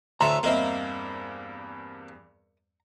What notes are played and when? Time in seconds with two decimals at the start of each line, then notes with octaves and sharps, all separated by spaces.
0.21 D2 A2 A4 E5 A#5 C6
0.43 E2 G2 A#3 C4 A#4 D#5 E5